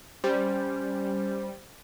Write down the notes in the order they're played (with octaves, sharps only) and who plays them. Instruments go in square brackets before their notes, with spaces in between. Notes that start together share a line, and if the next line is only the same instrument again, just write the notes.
[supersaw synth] G3 [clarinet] C#4 [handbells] C5